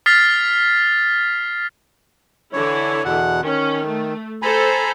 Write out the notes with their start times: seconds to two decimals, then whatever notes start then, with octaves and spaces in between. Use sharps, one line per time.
0.06 D#6 F6 A6 B6 C7
2.53 D3 E3 E4 C#5
3.05 E2 B2 F#5
3.44 D#3 C#4
3.85 A3
4.42 A4 C5 G#5 A#5 B5